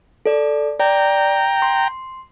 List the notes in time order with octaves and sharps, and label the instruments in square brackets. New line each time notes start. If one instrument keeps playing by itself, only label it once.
[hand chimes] A4 D5
[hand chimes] D5 [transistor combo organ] G5 A#5
[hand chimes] C6